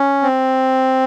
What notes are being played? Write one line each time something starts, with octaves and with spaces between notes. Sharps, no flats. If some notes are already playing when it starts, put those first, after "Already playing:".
Already playing: C#4
C4